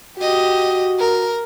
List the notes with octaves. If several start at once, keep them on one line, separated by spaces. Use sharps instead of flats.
F#4 G4 D#5
A#4